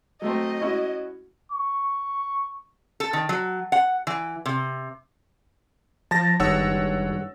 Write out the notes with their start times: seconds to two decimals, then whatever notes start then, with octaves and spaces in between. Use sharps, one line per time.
0.22 F#3 A3 C4 D#5
0.61 C#4 E4 F#4
1.52 C#6
3.00 A4
3.13 D#3
3.29 F#3
3.72 F#5
4.07 E3
4.46 C3
6.11 F3 A5 A6 A#6
6.40 F#1 G2 D#3 G#3 C#5 F#5 E6